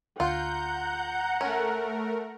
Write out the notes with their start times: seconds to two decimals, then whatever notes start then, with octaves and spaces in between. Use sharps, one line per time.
0.20 D2 F4 F#5 A#5 G6
1.41 A3 C#4 A#4